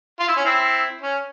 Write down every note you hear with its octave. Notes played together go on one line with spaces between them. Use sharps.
F4
E4
C#4
C4 E4
C#4